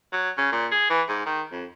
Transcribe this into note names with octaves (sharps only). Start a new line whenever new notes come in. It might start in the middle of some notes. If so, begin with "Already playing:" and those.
F#3
C#3
A#2
G#4
E3
G#2
D#3
F2